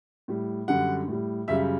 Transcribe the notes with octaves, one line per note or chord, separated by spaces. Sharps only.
A2 G3
F#2 D3 G3 F#5
A2 G3
F#2 C#3 G3 E5